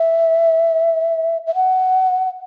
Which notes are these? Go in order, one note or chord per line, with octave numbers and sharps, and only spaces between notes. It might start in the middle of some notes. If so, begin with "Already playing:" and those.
Already playing: E5
E5
F#5